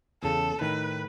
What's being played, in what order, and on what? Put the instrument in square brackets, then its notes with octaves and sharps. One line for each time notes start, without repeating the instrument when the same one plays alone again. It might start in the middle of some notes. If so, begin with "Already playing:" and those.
[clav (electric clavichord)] E2 C#3 [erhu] A4
[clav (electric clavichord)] A2 D#3 [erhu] B4